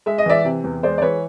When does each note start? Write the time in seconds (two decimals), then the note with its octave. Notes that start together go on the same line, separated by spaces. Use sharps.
0.06 G#3 E5
0.18 D#5
0.26 E3 D5 E5
0.45 C3
0.64 E2
0.83 G#3 C5 D5
0.98 D5
1.02 E3 B4 C#5